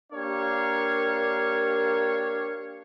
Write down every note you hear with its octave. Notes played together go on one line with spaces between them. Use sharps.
A#3 D4 G4 A#4 C#5 F5